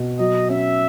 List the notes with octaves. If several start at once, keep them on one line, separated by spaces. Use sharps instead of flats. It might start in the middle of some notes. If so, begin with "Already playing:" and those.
Already playing: B2
F#3 D#5
C#4 E5